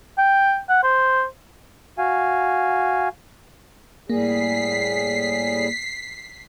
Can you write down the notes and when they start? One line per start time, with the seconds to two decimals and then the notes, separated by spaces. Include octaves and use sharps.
0.18 G5
0.69 F#5
0.84 C5
1.98 F#4 F5 G#5
4.09 A2 G3 A#3 G#4 B6 C7